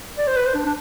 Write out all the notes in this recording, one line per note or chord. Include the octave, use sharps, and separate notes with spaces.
D5
C5
B4
C5
D4
D4